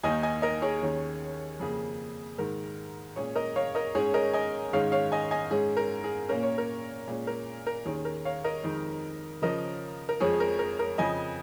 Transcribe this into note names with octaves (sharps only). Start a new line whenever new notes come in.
D#2 D#3 A#3 D#4 D#5 G#5
D#5 G#5
A#4 D#5
G#4 C#5
D#2 D#3 C#4
F2 C#3 A#3 G#4
G#2 D#3 G#3 A#4
A#2 G#3 C#4 G#4 C#5
A#4 D#5
C#5 F5
A#4 D#5
G#2 G#3 C#4 G#4 C#5
A#4 D#5
D#5 G#5
G#2 D#3 G#3 C#4 C#5 F5
C#5 F5
D#5 G#5
D#5 G#5
G#2 G#3 C#4 G#4
A#4
G#4
A#2 A#3 C#4 A#4
C#5
A#4
A#2 G#3 C#4
A#4
A#4
D#2 D#3 C#4 G#4
A#4
C#5 F5
A#4 D#5
F2 D#3 G#3 D#4
C#3 F3 C#4 A#4 D#5
A#4
F2 F3 G#3 G#4 C#5
A#4
A#4
A#4
F2 C#3 F3 D#5 G#5